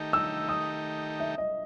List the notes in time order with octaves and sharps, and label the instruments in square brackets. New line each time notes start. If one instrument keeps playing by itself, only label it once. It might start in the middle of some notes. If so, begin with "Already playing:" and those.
Already playing: [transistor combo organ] D#3 A3 D#4 G4
[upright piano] E6
D#6
E5
D#5